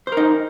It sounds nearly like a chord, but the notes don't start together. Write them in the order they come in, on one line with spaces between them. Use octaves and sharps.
C5 A#4 D#4